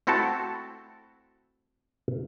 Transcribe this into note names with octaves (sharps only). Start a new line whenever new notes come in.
A3 C4 E4 F#4 A4 A5